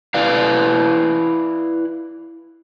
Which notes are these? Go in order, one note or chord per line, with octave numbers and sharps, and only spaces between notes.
E4 B4 D5 F5